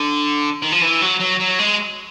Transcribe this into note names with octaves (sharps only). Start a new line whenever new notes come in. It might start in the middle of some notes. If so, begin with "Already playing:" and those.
Already playing: D3
D#3
F3
E3
F#3
F#3
F#3
G#3